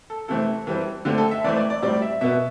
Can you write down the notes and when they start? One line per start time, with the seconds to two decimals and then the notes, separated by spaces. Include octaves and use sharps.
0.10 A4
0.28 C3 E3 A3 C4 A4
0.67 E3 G3 C4
1.05 D3 A3 C4 G4
1.18 A4
1.31 E5
1.44 E3 A3 C4 D5
1.57 D5
1.70 D5
1.82 A2 G3 C4 D5
2.02 E5
2.21 B2 B3 E5